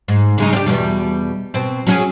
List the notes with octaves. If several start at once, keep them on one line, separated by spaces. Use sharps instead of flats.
G#2
C#3 G#3 D#4
C4 D4 G4
E2 B2 G3
B2 C4
F#3 C#4 G#4